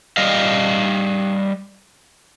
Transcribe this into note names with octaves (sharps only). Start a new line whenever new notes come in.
G3 D#5 F5